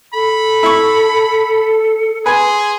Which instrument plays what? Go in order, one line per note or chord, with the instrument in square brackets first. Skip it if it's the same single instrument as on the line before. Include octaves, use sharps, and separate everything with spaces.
[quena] A4 [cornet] B5
[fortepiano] E4 C#6
[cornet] G#4 [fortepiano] B4 G#5 [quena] C6